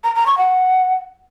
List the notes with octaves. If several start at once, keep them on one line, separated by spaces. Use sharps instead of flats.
A#5
A#5
C#6
F#5